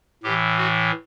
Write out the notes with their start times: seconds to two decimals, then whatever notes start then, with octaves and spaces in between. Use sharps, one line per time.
0.23 A2 E3 G4
0.57 F#4